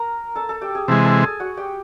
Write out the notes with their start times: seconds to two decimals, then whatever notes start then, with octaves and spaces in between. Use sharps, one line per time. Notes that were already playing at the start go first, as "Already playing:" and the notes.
Already playing: A#4 A#5
0.35 A4 A5
0.49 A4 A5
0.61 G4 G5
0.75 G#4 G#5
0.88 C3 E3 G#3 A4 A5
1.05 A4 A5
1.23 G#4 G#5
1.40 F#4 F#5
1.57 G4 G5